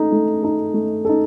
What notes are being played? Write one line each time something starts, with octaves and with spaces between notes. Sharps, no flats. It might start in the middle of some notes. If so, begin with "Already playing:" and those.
Already playing: A3 D#4 A4
A3
D#4 A4
A3
D#4 A4